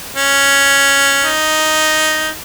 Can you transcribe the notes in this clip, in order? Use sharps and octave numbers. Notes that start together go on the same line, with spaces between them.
C#4
D#4